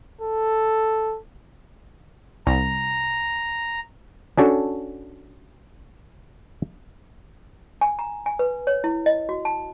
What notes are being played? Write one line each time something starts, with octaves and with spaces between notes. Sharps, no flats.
A4
C2 A#5
C#4 D4 F#4 A4
G#5
A#5
G#5
B4
C#5
E4
D#5
F#4
A5